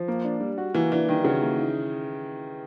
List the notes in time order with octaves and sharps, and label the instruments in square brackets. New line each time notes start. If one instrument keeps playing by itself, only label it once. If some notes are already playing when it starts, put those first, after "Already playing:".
Already playing: [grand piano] F3
A#3
D4
G3
F#4
[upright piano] E3 [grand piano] A#3
[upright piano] E3 [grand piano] D4
[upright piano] D#3 [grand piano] G3
[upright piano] C#3 [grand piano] F#4
[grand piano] A#3
D#4